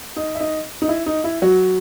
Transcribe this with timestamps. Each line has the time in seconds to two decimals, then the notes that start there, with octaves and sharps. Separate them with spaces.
0.16 D#4 D#5
0.35 E5
0.40 D#4 D#5
0.82 D#4
0.88 E4
1.06 D#4
1.24 E4
1.42 F#3 F#4